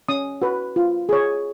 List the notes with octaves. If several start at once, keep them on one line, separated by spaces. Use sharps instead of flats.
C#4 D#6
F#4 B4
F4
G#4 C#5